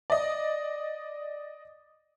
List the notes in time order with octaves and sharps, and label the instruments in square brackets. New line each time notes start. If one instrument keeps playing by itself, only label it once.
[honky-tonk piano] D5 D#5